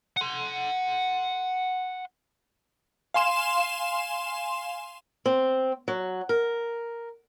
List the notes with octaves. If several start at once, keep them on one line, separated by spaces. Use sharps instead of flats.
F#5 C6
F5 G#5 C6 E7
C4
F#3
A#4